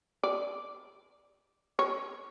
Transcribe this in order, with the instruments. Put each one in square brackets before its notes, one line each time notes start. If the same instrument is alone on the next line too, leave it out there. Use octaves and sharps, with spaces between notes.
[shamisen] D5
C#5